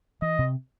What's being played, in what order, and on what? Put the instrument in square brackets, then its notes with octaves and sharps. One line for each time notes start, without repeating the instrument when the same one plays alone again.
[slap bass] E3 [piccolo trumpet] D#5
[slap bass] C3